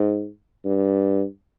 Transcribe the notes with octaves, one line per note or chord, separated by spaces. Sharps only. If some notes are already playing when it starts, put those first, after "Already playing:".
Already playing: G#2
G2